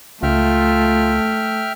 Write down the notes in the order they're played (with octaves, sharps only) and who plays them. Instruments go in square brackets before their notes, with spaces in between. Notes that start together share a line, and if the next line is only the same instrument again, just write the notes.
[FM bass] C#2 [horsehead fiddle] A3 [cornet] F4 [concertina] E5 G5 F6